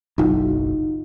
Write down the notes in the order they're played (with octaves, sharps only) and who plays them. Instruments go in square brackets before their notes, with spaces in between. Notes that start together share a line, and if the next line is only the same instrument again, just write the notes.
[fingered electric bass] F#1 B1 [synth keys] D#4 F4 F#4